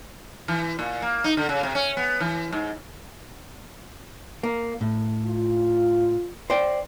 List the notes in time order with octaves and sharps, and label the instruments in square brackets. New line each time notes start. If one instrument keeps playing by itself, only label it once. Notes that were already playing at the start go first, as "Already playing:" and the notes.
[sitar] E3
A#2
A#3
D#4
D3
C#3
C3
C#4
B3
E3
G#2
[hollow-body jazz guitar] A#3
A2
[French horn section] F4
[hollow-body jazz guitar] C5 D5 G5